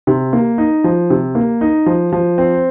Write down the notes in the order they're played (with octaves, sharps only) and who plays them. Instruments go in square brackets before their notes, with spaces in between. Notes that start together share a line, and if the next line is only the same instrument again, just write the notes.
[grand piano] C3
A#3
D#4
F3
C3
A#3
D#4
F3
F3
C4